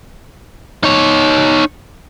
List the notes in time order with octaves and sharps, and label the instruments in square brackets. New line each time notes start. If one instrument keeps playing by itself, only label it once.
[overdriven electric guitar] D#4 C#5